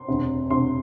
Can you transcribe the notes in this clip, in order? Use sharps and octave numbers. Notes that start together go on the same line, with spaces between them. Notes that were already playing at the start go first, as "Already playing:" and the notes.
Already playing: C6
E1 D2 C3
E1 D2 C3 C6